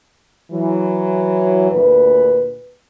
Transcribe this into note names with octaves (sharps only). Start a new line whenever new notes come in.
E3 F#3
D2 A#2 B4